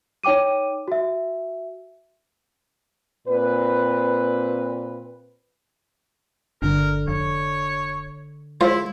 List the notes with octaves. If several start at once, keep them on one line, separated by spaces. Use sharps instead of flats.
D#4 C#5 G5 D6 D#7
F#4 E5
A#2 C4 B4
G1 D3 D4 A#4
F1 C#5
G#3 E4 F4 C5